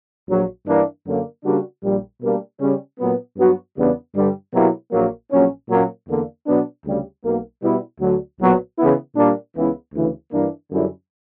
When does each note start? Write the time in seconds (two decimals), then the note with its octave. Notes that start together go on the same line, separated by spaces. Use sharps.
0.29 A#1 A#2 F#3
0.66 G2 E3 A#3 D4
1.06 F#2 D3 F#3 A#3
1.44 C#3 G3 A#3 D4 F#4
1.83 A#1 A#2 G3
2.21 B2 G3 A#3 D4
2.60 C#3 G3 C#4
2.99 A#2 F#3 B3
3.37 G2 F#3 B3 F#4
3.76 E2 C#3 G3 B3 D4
4.15 G2 D3 G3
4.53 B2 F#3 A#3 E4 G4
4.92 A#1 A#2 F#3 A#3
5.31 A#1 A#2 F#3 C#4
5.69 A#2 F#3 A#3 C#4
6.08 E2 D3 A#3
6.46 B2 F#3 B3 D4
6.85 D2 C#3 G3
7.24 B1 B2 A#3
7.63 B2 G3 B3 E4
8.01 D2 D3 F#3
8.39 B1 A#2 F#3 B3
8.78 C#3 E3 B3 E4
9.17 A#2 G3 A#3 D4
9.56 C#2 C#3 E3 B3 E4
9.94 D2 C#3 E3
10.33 G2 E3 A#3 D4
10.71 F#2 D3 G3 C#4 E4